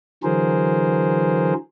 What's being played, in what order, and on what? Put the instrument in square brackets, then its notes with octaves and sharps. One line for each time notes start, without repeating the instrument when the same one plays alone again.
[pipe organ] D3 E3 F#3 G#4 A#4 C5